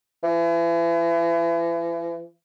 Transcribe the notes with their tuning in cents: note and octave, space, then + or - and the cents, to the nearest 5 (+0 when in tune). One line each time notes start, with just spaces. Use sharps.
E3 +40